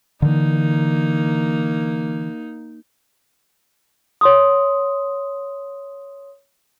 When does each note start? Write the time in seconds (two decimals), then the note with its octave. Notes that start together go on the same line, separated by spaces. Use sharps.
0.22 D3 E3 A#3 D#4
4.21 C#5 C6 D#6